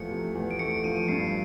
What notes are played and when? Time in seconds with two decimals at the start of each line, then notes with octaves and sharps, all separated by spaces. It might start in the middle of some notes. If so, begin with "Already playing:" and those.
Already playing: E2 F3 A3 C#7
0.10 C3
0.35 E2
0.51 D7
0.59 A3 C#7
0.71 D7
0.84 F3 D#7
0.97 D7
1.08 G2 C7